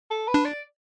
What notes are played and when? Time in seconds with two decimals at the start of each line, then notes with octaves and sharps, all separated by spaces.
0.11 A4
0.28 B4
0.34 D4
0.45 D5